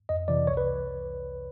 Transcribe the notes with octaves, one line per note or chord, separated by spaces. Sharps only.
F2 D#5
C3 E3 D5
C2 C#5
B4